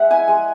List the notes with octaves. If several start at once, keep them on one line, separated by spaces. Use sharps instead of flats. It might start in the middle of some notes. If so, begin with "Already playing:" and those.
Already playing: G#3 E5 F#5
E4 G#5
G#3 G#5